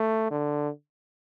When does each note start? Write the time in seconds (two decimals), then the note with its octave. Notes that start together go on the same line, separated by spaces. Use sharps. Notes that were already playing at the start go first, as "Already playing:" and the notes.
Already playing: A3
0.31 D3